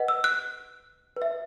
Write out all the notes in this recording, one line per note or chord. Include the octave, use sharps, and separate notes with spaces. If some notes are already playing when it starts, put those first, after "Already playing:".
Already playing: B4 D#5 F#5
E6
F#6
B4
E5